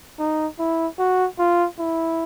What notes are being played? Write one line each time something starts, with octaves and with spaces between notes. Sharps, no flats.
D#4
E4
F#4
F4
E4